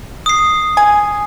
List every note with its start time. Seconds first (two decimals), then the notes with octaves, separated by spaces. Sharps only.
0.26 D#6 C7
0.77 G#5